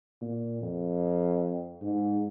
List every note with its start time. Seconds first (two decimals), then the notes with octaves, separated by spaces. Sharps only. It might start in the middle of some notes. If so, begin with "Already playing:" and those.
0.21 A#2
0.62 F2
1.82 G#2